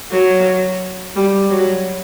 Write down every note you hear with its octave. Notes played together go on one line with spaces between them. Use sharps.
F#3
G3
F#3